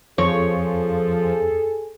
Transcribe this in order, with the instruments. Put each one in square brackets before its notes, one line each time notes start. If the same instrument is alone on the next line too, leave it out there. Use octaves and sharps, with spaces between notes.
[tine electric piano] F2 [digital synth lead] F3 [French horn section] G#4 A4 [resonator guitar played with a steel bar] C#5